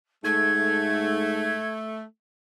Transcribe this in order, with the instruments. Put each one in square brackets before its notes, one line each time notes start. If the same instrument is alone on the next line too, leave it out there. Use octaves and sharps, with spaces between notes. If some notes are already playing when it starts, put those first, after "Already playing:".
[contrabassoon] G#2 [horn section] A3 [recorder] G#6